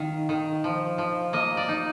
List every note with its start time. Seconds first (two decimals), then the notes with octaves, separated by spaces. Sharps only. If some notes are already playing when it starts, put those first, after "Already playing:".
Already playing: D#3 F5
0.29 D#3
0.64 F3
0.98 F3
1.33 A#3 D#5
1.57 D5
1.68 D#4